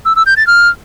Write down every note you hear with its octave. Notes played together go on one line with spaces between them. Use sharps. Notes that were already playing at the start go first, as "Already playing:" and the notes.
E6
E6
G6
A6
F6